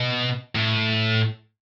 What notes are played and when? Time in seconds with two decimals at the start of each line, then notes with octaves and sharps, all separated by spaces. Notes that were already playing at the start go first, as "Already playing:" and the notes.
Already playing: B2
0.55 A2